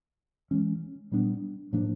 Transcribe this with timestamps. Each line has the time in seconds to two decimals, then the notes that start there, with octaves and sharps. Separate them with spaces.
0.51 E3 G#3 C#4
1.12 A#2 G3 B3 D4
1.73 A2 F3 A#3 D4